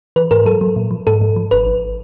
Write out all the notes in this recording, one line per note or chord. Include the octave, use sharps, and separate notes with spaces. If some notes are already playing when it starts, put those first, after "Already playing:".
E3 B4
G#2 A#4
F#3 A4
F#3
A#2
F3
G#2 A4
G#2
F3
G1 B4
G#1